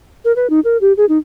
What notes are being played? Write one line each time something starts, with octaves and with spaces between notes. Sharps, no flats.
A#4
B4
D#4
A#4
G4
G#4
D#4